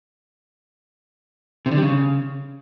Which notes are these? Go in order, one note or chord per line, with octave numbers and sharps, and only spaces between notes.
C3
D3
G3
C#3